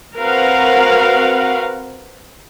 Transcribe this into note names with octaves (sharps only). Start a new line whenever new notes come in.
C4 F#4 A#4 B4 F5 F#5